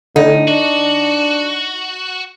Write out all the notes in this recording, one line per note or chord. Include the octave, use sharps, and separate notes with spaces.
A2 D3 D#4
D4 F#4